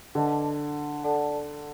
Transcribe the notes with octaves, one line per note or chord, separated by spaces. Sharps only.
D3 B4 D#5 F#5 A5 D6
A4 D5 F#5 A5